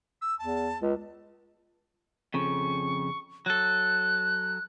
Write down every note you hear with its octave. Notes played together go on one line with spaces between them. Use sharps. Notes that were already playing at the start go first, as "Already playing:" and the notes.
E6
E2 A5
C#2
F2 C#3 C#6
F#3 A4 F#6